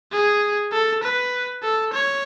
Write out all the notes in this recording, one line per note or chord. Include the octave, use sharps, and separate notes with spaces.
G#4
A4
B4
A4
C#5